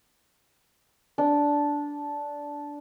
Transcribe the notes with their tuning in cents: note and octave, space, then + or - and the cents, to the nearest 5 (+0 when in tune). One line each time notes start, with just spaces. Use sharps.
D4 -10